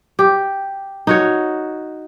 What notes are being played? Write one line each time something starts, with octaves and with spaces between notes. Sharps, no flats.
G4
D#4 F#4 C#5